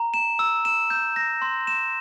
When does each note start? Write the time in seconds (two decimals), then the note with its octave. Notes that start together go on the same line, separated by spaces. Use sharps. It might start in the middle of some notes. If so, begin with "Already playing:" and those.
Already playing: A#5
0.14 E7
0.39 E6
0.65 E7
0.90 G6
1.16 A#6
1.42 C6
1.67 E7